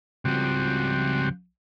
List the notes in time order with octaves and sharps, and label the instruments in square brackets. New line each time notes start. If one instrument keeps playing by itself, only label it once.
[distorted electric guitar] C#2 F3 [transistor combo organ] G3 C4 F#4